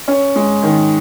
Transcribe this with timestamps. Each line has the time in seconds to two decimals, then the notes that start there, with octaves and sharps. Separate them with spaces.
0.08 C#4
0.36 G#3
0.63 D#3